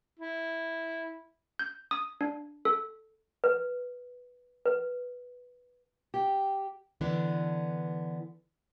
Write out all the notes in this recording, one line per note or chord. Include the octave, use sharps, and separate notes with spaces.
E4
G6
D#6
D4
A4
B4
B4
G4
D3 E3 B3 D4